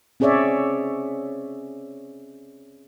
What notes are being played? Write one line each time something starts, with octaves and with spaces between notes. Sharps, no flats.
C4 C#4 G#4 C#5 D5 E5